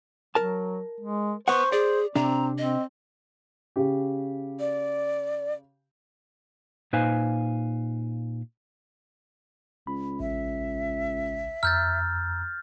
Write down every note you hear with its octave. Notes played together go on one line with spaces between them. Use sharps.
F#3 A#4 A5
G#3
B3 C5 F#5 C#6
G#4 D5
C3 C4 D4 A#5
C4 D#5
C#3 G4
D5
A#2 D#4 B4 C5 F5 G#5
C#2 B5
A1 E5
F2 A#5 E6 F6 G6 A6